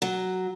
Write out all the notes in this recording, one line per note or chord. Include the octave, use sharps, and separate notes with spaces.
F#3